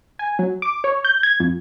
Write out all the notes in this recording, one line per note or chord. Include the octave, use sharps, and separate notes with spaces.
G#5
F#3
D6
C#5
G6
G#6
F2